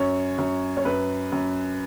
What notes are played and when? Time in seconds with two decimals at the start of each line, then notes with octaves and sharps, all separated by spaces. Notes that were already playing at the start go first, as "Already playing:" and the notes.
Already playing: F#2 C#5
0.38 F#2
0.77 C#5
0.85 F#2 B4
1.32 F#2